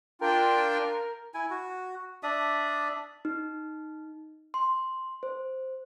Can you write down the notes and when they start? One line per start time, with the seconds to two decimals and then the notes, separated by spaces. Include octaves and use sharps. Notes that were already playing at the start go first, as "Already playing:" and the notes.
0.22 D4 F4 A#4 G5
1.34 E4 G#5
1.50 F#4
2.23 D4 D5 E5 D#6
3.25 D#4
4.54 C6
5.23 C5